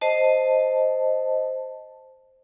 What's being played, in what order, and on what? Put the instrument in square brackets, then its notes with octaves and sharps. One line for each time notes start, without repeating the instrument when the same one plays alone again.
[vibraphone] C5 D#5 A5